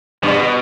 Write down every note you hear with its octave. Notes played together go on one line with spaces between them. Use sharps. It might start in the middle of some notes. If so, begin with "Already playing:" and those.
G2 B2